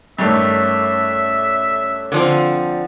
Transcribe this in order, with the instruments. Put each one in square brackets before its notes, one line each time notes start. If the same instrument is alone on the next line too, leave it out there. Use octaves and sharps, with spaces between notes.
[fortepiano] G2 D#3 A3 [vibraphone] C#4 A4 C#5 [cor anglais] E5
[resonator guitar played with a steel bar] D3 F3 C4